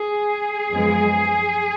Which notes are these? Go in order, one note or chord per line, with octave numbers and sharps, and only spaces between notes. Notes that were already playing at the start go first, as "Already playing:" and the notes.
Already playing: G#4
F#2 F3 G#3 B3